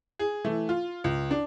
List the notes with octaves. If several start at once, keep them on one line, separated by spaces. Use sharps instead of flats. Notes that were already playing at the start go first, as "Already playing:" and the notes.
G#4
E3 A3
F4
C#2
D4